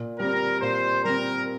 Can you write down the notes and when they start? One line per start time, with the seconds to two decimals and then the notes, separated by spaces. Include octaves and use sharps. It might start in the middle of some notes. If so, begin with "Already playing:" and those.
Already playing: A#2
0.19 G3 C4 A#4
0.62 A#2 C5
1.05 G3 C4 A#4